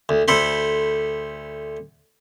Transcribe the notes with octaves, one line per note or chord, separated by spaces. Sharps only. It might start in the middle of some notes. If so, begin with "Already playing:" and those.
D2
D2 A4 C5 B5